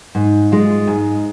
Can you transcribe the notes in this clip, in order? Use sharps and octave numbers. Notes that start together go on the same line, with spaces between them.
G#2
G#3 F4
G#2